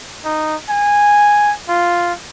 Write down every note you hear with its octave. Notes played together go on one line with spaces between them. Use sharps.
D#4
G#5
F4